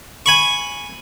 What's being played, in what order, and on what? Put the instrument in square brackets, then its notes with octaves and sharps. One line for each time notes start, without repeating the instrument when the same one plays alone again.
[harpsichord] G#5 B5 C#6